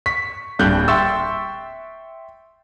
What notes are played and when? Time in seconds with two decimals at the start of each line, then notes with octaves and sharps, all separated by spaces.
0.06 C#6 B6
0.59 D1 A#1 D3 G3 F#6 G6
0.88 E5 G5 C6 C#6 E6 A6